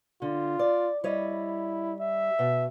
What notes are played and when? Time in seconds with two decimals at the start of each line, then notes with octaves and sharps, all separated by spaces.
0.22 D3 F4
0.59 D5
1.04 G3 E4 C#5 D#5
2.00 E5
2.39 B2